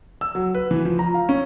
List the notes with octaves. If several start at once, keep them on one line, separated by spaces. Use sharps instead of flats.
E6
F#3
B4
E3
F3
A#5
F5
C#4